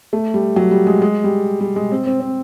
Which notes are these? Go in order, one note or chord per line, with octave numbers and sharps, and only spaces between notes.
A3
G3
F#3
G3
G#3
G#3
G3
G3
G#3
C4
C4
C4